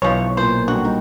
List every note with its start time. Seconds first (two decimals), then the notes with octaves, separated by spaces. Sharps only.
0.02 B1 E3 F3 C#5
0.37 A#2 C5
0.68 D3 G3 F#4
0.84 G3 D#4